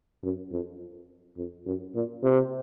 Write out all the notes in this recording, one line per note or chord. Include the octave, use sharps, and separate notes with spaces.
F#2
F2
F2
F#2
A#2
C3